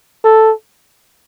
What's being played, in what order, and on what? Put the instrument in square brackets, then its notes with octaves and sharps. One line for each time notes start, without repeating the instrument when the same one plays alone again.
[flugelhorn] A4